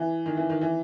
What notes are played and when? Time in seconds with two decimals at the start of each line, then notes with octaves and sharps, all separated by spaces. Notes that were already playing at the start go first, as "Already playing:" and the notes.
Already playing: E3
0.26 D#3
0.37 E3
0.50 D#3
0.61 E3